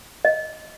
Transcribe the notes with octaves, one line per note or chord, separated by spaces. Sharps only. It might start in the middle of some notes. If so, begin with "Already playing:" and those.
D#5